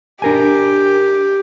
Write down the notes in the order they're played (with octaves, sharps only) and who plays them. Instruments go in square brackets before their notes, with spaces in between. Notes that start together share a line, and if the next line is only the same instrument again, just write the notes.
[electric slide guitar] D4 A#4 G#5 [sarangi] G4